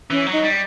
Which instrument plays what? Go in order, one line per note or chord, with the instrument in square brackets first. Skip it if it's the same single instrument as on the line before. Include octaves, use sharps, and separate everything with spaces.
[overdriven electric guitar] E3 [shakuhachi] C#4
[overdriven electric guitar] F#3
[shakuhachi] D#4
[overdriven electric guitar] G3